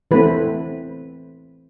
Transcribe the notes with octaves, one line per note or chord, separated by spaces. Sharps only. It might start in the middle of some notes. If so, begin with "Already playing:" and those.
E3 A3 C4 B4